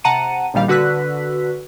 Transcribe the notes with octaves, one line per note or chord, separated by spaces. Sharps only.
C3 F#5 A5 A#5 C#7 D#7
A#1 A#2 D#3 G3 F5
D3 F#4 B4 E6 F#6 B6